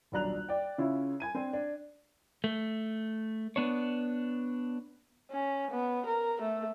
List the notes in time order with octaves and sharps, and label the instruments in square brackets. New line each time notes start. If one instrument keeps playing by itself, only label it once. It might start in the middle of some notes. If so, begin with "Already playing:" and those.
[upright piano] D#1 B1 D4 A#5 F#6 F7
D5 G5
C#3 C#4 E4 F4
G#5 G#6 D#7
C4 D4 C5
D4
[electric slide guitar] A3
B3 D4 C#5
[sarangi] C#4
B3
A#4
A3